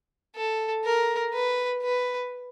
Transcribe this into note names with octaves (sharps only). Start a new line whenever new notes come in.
A4
A#4
B4
B4